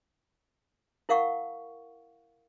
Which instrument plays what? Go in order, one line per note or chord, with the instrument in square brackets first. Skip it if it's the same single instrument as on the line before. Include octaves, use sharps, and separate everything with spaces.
[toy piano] E4 A#4 F5 F#5 C#6